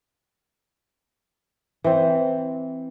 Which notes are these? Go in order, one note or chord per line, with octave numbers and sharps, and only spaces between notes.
E3 C4